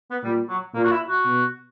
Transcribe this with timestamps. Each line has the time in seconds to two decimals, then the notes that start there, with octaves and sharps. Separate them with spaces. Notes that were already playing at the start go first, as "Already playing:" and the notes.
0.10 B3
0.23 A#2 G3
0.49 F#3
0.74 A#2 A#3
0.84 F#4
0.92 E4
1.08 F#4
1.25 B2